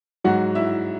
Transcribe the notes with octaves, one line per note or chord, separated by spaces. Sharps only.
G#2 F#3 F#4 F#5
E4 E5